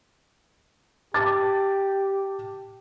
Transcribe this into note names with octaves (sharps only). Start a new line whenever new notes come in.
G4 A5 D6 A6